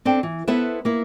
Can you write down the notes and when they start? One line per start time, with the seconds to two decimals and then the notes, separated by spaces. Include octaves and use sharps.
0.05 C4 D4 A4 G5
0.23 E3
0.47 B3 E4 A4 B4 C5 E5
0.85 A#3 E4